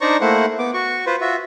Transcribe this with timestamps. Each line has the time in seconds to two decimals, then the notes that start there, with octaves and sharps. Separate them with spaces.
0.01 D4 D#4 C5 D5 A#5 C#6
0.21 A3 A#3 E4 C5 F#5
0.59 B3 D6
0.74 F#4 C#6
1.06 F4 B4 C5
1.21 F4 F#4 E5